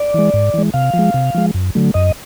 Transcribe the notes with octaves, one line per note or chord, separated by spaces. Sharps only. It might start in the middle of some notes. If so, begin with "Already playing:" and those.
Already playing: D5
E3 G#3
G#2
E3 G#3
C3 F5
F3
G#3
C3
F3 G#3
F#2
D3 F#3 A3
F#2 D#5